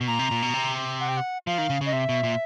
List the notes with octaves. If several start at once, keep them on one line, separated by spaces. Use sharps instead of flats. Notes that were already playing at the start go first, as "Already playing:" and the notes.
B2
A#2 A#5
C3
A#2
B2
C3
F#5
G5
F#5
F3 F5
D#3
C#3
C#3
D#5
C3 E5
B2
A#2